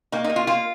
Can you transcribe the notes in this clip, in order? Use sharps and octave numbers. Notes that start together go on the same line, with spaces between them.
A#3 D#4
D#4
A#3
F4
A#3 F4